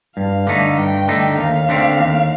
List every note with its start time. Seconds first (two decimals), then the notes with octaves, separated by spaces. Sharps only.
0.17 G2 F5
0.47 D3 A3 D#4
0.77 G2 G5
1.08 D3 A3 D#4
1.38 D#2 F5
1.69 D3 A3 C4
1.99 D#2